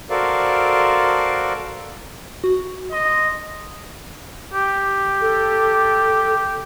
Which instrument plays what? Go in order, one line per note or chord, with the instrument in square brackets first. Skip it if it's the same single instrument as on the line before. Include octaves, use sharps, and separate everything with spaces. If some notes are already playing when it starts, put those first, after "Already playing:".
[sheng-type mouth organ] F#4 A4 A#4 C5 D5 F5
[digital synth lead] F#4
[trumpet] D#5 [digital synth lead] C6
[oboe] G4
[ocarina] A4